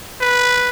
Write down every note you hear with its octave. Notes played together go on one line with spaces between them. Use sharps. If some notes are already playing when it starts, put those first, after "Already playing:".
B4